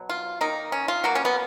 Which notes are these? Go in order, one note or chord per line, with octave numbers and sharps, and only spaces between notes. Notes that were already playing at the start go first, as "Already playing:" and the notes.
Already playing: B2 F#3
F4
D#3 A#3 D#4
C#4
F4
B2 F#3 A#3 F#4
C#4
B3